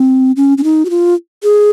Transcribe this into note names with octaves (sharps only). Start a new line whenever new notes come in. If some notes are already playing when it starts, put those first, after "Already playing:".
Already playing: C4
C#4
C#4
D#4
F#4
F4
G#4